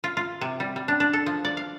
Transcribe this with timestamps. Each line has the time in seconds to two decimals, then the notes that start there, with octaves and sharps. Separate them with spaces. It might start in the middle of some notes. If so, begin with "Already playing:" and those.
0.04 F4
0.17 F4
0.41 C3
0.60 G3
0.76 G3
0.88 D4
1.00 D4
1.13 A4
1.26 F3
1.45 D5
1.57 F5